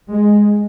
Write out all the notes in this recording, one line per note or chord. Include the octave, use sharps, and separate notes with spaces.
G#3